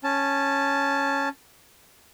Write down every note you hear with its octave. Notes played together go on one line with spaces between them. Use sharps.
C#4 A5